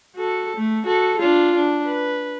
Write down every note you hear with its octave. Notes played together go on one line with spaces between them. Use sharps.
F#4 A4
A3
F#4 A4
D4 F4
D4
B4